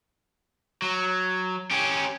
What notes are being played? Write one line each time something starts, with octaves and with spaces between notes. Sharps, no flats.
F#3
C#4 G4